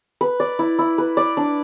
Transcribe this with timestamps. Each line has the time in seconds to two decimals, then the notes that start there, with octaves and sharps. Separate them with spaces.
0.21 B4
0.40 D5
0.59 E4
0.79 E4
0.98 B4
1.17 D5
1.37 D4